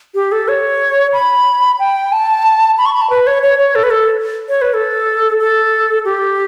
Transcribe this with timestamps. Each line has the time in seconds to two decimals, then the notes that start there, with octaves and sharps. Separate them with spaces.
0.15 G4
0.32 A4
0.48 C#5
1.13 B5
1.79 G5
2.12 A5
2.78 B5
2.86 C#6
2.93 B5
3.02 A5
3.10 B4
3.27 C#5
3.43 C#5
3.59 C#5
3.75 A4
3.83 B4
3.90 A4
4.49 C#5
4.62 B4
4.74 A4
5.40 A4
6.05 G4